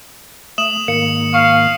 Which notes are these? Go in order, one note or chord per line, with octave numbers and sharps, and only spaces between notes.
A3 D#6 E7 F#7
G#2 D#3 A#3 C#7
F5 C#6